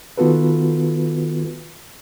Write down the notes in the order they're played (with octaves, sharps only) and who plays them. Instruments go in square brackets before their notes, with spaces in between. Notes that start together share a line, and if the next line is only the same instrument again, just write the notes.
[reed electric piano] D#3 B3 F4 F#4 A4 B4